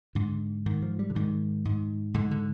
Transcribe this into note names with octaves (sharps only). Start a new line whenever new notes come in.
G#2 D3
G#2 D#3
F3
G3
D3
G#2 D#3
G#2
G#2 D3
D3